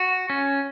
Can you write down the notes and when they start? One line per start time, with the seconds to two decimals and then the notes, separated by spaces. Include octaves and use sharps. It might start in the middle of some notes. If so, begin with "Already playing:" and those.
Already playing: F#4
0.30 C#4